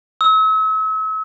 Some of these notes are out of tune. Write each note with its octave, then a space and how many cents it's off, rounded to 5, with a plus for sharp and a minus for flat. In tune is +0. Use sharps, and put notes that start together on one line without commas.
E6 -40